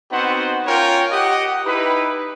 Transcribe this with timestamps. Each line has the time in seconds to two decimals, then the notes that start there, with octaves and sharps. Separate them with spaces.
0.11 B3 C4 D#4 F#4 C5 F#5
0.66 C#4 F4 A#4 C#5 G5
1.11 G4 D#5 F#5
1.65 D#4 E4 G4 B4